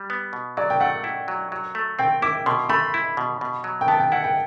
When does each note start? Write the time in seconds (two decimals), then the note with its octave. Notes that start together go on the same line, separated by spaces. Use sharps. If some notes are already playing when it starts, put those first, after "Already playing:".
Already playing: G3
0.10 B3
0.33 B2
0.57 F#3 D5
0.70 G5
0.80 A3 F#5
1.04 E4
1.28 F#3
1.52 F#3
1.75 A3
1.99 C4 G5
2.22 E4 D6
2.46 B2 C6
2.69 A3 B5
2.94 E4
3.17 B2
3.41 B2
3.64 F#3
3.81 G5
3.88 B3 A5
4.00 G5
4.12 E4 F#5
4.24 G5